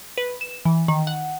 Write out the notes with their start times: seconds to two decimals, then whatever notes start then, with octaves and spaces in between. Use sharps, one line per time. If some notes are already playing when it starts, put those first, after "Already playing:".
0.18 B4
0.41 E7
0.65 E3
0.88 D#3
1.07 F#5